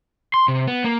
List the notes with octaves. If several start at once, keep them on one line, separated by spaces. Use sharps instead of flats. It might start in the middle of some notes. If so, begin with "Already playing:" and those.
C6
C3
B3
A#3